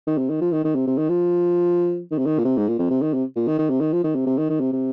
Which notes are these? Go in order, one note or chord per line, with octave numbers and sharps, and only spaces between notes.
D#3
C3
D#3
F3
D#3
D#3
C3
C3
D#3
F3
D#3
C3
D#3
A#2
C3
G#2
A#2
F2
C3
D#3
C3
A#2
D#3
D#3
C3
D#3
F3
D#3
C3
C3
D#3
D#3
C3
C3